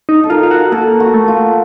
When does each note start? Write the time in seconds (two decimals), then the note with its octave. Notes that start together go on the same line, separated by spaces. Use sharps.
0.09 D#4
0.24 A4
0.30 F4 A#4
0.43 F4
0.51 F#4
0.72 A#3 A4
1.00 F#4
1.14 A3
1.28 F4